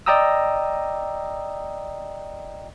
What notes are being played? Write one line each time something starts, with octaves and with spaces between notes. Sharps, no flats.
D5 D#5 G5 A#5 D#6 E6